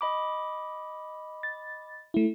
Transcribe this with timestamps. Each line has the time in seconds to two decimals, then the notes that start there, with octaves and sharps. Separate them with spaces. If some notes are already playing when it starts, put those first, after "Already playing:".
0.01 D#5 B5 D6
1.43 A6
2.14 A3 E4